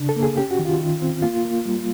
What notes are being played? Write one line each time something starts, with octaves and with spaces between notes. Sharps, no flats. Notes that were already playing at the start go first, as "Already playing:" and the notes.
Already playing: C#3 D4
A4
A#3
G#4
C#4 G4
F#4
D#3
F4
D#3
C4
A#3 F4
A#3
G3